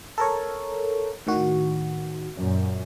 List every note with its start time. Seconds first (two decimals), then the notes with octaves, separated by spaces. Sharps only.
0.18 A4 A#4 C#5
1.27 A2 D#3 F#4
2.35 F#2 A#2